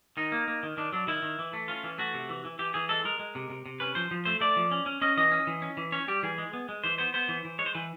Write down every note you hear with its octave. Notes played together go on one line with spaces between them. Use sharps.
D#3 D#4
A#3
A#3
D#3
D#3 D4
F#3 D4
D#3 E4
D#3
E3
A3
C#4 F4
E3
A3 F#4
C3
E3
E3
E3 G4
E3 G#4
G#3 A4
G#3 A#4
G#3
C3
C3
C3
C#4 B4
F3 C5
F3
A3 C5
A3 D5
F3
C#4
C#4
C#4 D#5
E3 D#5
C#4
E3
C#4
E3
C#4 C#5
G3 G4
E3 G#4
G#3
B3
G#3
E3 C5
B3 C5
B3 C5
E3
E3
G#3 C#5
C5
E3 B4